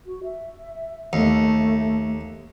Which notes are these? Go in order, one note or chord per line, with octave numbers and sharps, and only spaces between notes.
F#4
E5
D#2 A3